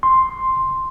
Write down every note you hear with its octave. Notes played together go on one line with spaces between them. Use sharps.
C6